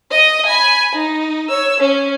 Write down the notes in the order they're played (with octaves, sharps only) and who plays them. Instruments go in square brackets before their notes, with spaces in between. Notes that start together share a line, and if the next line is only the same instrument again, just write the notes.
[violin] D#5 D#6
G#5 B5
D#4
C#5 E6
C#4